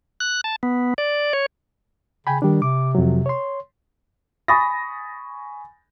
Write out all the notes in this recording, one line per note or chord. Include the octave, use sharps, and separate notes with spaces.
F#6
A5
B3
D5
C#5
C#3 G5 G#5 B5
D#3 G3 D4
C3 D6
F2 F#3
C#5 C6
G#5 B5 C#6 D#6 A6 A#6